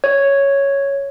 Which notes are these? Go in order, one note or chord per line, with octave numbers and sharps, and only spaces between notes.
C#5